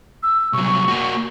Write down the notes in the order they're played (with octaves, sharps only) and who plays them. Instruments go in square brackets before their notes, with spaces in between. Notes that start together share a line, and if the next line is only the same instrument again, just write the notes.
[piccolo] E6
[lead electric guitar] C2 F#3 [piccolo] C#6
[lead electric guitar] A#3 F#4